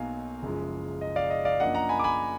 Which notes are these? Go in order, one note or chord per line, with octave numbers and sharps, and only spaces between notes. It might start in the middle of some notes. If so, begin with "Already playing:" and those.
Already playing: B1 B2 F#3 A#3 D#4 F5 G#5
F#1 F#2 F3 G#3
D#5
D5 F5
D#5
D5 F5
F#2 F3 A#3 D4 D#5 F#5
F#5 A#5
G#5 B5
D6
G#5 B5